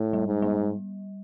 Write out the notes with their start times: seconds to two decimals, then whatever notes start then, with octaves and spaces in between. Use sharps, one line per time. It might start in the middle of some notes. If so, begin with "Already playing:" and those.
Already playing: A2
0.13 G3
0.27 G#2
0.42 G3